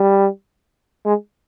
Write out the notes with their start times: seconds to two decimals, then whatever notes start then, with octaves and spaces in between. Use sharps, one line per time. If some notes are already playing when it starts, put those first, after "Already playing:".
Already playing: G3
1.05 G#3